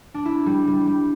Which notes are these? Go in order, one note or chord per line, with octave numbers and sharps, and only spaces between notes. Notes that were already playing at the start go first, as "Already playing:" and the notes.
D4
E4
G3
G3
G3